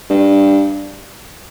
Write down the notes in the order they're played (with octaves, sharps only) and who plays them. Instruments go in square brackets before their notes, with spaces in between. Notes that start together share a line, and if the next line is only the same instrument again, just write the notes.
[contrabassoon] G2